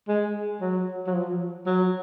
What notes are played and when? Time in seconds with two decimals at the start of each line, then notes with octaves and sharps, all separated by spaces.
0.08 G#3
0.61 F#3
1.07 F#3
1.14 F3
1.66 F#3